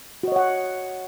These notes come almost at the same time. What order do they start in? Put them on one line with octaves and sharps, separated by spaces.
F#4 D#5 C#5 F#5